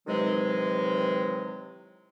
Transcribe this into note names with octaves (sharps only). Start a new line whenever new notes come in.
C3 D#3 E3 F#3 G#3